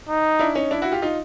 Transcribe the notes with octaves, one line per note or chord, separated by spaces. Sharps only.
D#4
D4 E4
C#4 D#4
D4 E4
E4 F#4
F4 G4
D#4 F4